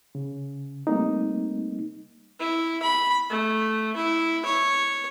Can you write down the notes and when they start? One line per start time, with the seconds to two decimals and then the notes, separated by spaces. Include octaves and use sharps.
0.15 C#3
0.87 G3 A3 A#3 C4 D#4
2.40 E4
2.83 B5
3.30 A3
3.96 E4
4.45 C#5